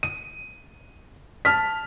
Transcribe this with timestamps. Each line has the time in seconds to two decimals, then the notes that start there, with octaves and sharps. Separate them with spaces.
0.03 D#7
1.45 A5 F6 B6